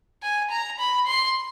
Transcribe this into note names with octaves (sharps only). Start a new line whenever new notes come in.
G#5
A#5
B5
C6